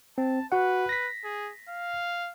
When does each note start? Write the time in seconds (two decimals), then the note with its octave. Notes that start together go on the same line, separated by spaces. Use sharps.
0.18 C4 A5
0.52 F#4 B4 F#5
0.89 A#6 B6
1.24 G#4
1.69 F5